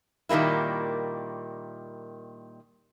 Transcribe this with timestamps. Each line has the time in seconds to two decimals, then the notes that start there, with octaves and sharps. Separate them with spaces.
0.29 A#2 D#3 G3 A#3 E4